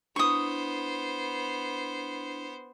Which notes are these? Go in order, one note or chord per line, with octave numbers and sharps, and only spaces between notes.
B3 D4 E4 C5 C#6 D#6